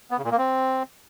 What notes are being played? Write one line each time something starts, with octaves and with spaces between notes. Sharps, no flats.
B3
C#3
A#2
A#3
C4